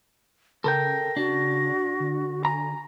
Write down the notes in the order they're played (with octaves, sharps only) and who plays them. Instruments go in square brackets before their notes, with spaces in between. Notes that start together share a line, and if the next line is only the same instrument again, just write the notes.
[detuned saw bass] C#3 [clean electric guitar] A4 A#4 G5 [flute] A#6
[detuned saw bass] C#3 [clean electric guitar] D4 [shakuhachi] F#4
[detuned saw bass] D3
[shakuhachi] G#5 [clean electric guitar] A#5